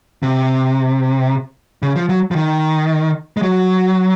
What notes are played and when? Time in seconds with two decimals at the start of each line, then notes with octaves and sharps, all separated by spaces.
0.23 C3
1.82 C#3
1.96 F3
2.09 F#3
2.31 F3
2.36 D#3
3.37 G#3
3.42 F#3